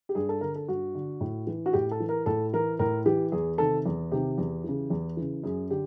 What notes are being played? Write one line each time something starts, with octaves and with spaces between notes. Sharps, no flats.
G4
G2 G#4
A4
D3 A#4
A4
G2 F#4
D3
A2
E3
F#4
A2 G4
A4
E3
A#4
A2 A4
E3 A#4
A2 A#4
E3 G4
E2 G#4
C3 D#3 A4
E2
C3 D#3 G4
E2
C#3 E3
E2
C#3 E3
F#2 G#4
D3 G4